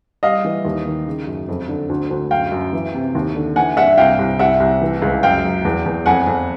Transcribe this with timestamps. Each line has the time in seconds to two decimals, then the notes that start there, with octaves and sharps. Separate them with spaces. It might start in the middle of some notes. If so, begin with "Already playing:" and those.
0.23 G3 D#5 F5
0.45 E3
0.65 D#2
0.86 D#3
1.07 C#3
1.27 F#2
1.48 F2
1.69 D3
1.89 D2
2.11 D2
2.31 F#2 F5 G5
2.52 F#2
2.73 E3
2.95 C3
3.15 D#2
3.35 D3
3.56 E3 F#5 G#5
3.77 G2 E5 F#5
3.98 C2 F5 G5
4.19 C2
4.39 C2 E5 F#5
4.60 C2
4.82 E3
5.02 C#2
5.23 F#2 F5 G5
5.44 F#3
5.65 E2
5.86 E2
6.06 F2 F#5 G#5
6.27 F2